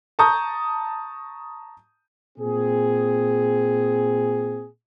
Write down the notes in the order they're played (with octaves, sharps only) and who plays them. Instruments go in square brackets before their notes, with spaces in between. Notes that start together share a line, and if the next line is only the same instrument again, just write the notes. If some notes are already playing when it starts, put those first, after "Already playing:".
[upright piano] A5 A#5 C#6 D#6 G6
[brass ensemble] A#2 C4 G#4